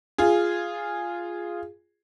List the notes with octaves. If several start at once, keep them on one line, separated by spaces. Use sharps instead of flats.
F4 G#4